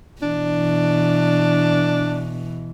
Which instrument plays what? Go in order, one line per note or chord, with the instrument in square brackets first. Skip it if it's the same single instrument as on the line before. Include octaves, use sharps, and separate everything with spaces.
[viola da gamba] B2 E3 [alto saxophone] D4